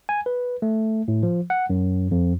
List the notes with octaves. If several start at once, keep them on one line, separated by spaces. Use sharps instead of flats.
G#5
B4
A3
A2
F3
F#5
F#2
F2